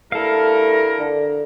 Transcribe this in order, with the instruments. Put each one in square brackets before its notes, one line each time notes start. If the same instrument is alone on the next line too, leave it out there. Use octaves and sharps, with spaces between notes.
[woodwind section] G2 E4 A#4 [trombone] A3 [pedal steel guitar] A4 F5
[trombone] D3